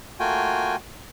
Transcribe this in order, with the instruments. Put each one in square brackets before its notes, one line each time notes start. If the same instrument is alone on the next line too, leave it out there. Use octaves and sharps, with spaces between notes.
[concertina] A3 A#3 F4 F#4 G5 G#5